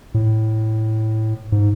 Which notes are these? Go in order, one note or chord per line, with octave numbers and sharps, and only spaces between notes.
A2
G#2